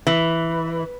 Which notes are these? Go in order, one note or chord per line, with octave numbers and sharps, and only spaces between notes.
E3